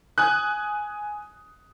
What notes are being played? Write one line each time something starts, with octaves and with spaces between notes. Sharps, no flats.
G#5 D#6 F#6